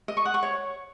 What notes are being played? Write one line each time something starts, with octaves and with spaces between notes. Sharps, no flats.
D#5
C#6
F#5
C#6
C#5